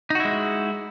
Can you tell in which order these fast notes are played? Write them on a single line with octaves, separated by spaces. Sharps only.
D#4 F#4 E4 G#3